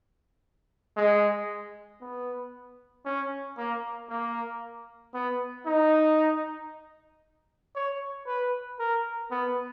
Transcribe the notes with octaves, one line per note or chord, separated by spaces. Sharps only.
G#3
B3
C#4
A#3
A#3
B3
D#4
C#5
B4
A#4
B3